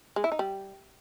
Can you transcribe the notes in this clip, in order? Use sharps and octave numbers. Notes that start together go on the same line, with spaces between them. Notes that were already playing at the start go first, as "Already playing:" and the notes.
G#3
E4
D#4
G3